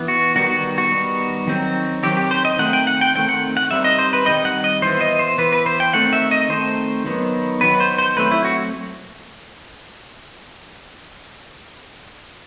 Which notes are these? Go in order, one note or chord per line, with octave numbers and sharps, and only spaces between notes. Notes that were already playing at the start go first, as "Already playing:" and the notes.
Already playing: E3 B3
F#4
D#3 G3 B3 F#4
F#4
F#4
D#3 G3 B3
D#3 F#3 C4
D#3 F#3 C4 G4
G4
C5
D#5
D#3 A3 C4 F#5
G5
F#5
G5
D#3 A3 C4 G5
F#5
F#5
D#3 G3 C4 E5
D#5
C5
B4
D#3 G3 C4 D#5
F#5
D#5
E3 B3 C5
D#5
C5
E3 B3 B4
B4
C5
G5
D#3 A3 C4 F#5
E5
D#5
D#3 A3 C4 C5
D#3 F#3 B3
D#3 F#3 B3 B4
C5
C5
F#3 A3 C4 B4
E4
F#4